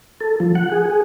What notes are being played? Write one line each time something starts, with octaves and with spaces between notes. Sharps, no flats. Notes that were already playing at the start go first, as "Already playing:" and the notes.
A4
F3
F#5
G#4
G#4